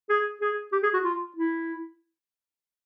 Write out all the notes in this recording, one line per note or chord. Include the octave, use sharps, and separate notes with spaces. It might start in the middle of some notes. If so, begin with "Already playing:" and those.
G#4
G#4
G4
G#4
F#4
F4
E4